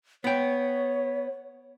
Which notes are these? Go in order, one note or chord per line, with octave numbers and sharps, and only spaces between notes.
B3 C#5 G5